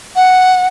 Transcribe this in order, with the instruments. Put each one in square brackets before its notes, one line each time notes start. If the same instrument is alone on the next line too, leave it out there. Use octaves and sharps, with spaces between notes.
[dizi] F#5